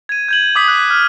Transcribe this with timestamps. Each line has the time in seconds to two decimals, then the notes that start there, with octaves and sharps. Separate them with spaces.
0.09 G#6 D#7
0.28 G6 G#6 F#7
0.55 D6 D#6 B6
0.68 F#6
0.90 F6